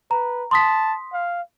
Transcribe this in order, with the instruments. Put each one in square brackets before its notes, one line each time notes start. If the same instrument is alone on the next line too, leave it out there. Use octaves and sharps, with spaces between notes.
[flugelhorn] B4 [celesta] A#5
[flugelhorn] A5 [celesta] C6 D#6 B6
[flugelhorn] F5